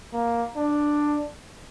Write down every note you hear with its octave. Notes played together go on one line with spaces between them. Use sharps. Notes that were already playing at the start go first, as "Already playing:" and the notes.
A#3
D4